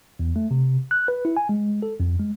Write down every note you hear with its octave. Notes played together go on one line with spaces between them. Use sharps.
E2
A3
C3
F#6
B4
E4
G#5
G#3
A4
F2
G#3